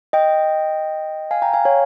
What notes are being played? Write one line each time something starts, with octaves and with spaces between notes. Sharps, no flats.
D#5 G5
F5 G#5
G5 A#5
F5 G#5
C#5 F5